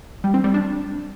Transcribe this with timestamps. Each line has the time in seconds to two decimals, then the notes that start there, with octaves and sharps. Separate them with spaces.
0.24 G3
0.34 C4
0.44 G3
0.54 D4